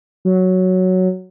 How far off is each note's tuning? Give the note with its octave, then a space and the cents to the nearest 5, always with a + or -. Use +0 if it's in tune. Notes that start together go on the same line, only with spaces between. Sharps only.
F#3 +0